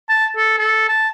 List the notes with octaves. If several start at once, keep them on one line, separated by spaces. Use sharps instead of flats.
A5
A4
A4
A5